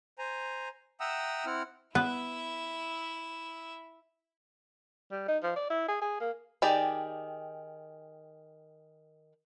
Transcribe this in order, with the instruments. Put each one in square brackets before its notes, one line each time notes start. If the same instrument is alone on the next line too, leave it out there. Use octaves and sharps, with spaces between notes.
[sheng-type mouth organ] C5 G#5 A#5
E5 F#5 G5 A#5 D#6 E6
C4 E4 F#5 F6
[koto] B3 [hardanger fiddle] E4 E5
[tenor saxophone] G3
D#4
F3
D5
E4
G#4
G#4
A#3
[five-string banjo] D#3 G4 G#4 D5